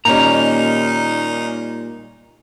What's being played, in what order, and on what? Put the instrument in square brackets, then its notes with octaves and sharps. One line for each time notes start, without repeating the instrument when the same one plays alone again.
[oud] A#2 D#3 G3 [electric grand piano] A#3 C#4 [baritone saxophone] D#4 [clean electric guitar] A#5